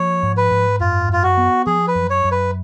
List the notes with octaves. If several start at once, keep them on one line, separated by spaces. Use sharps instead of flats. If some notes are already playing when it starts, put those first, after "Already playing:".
Already playing: F3 A#3 C#5
G#2
B4
G#2
F#2 F4
F#2 F4
F#4
B3
F3 G#4
B4
F#2
C#5
F#2
B4